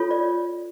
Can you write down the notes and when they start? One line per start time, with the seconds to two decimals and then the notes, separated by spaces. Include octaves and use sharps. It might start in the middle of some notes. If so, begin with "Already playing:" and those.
Already playing: F4 A4 C#5
0.11 D5